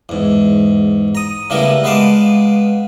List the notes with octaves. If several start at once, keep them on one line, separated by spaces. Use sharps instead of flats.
E2 G#2
A#5 D#6
C#3 G3 A3 B3 E4 A#4
G#3 B3 B4 F5 A5 D6